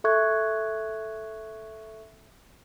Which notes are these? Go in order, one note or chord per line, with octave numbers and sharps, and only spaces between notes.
A4 E5 C#6 F#6 G#6